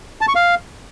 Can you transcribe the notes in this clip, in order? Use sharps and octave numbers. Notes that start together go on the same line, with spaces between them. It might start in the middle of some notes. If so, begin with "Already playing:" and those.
A5
C#6
F5